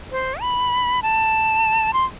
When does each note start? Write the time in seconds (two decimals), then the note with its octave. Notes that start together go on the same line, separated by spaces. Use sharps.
0.11 C5
0.41 B5
1.03 A5
1.93 C6